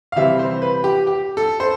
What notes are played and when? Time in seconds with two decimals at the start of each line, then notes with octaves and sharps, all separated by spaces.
0.12 F5
0.16 C3 E3 G3 C4 E5
0.39 C5
0.62 B4
0.84 G4
1.07 G4
1.37 A4
1.60 C5